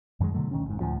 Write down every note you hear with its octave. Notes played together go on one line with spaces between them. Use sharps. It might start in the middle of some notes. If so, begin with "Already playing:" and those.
F#2 D#3 F#3 G#3
B2 D3 F#3 A3
D2 D#3 C#4
F#1 G#2
D2 A2 F3